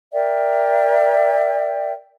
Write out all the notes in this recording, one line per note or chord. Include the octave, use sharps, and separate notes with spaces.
A#4 D5 E5 G5